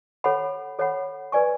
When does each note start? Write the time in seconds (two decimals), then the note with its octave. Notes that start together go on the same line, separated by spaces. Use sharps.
0.24 A4 C#5 F#5 B5
0.79 A4 C#5 F#5 B5
1.32 B4 D5 G#5 C#6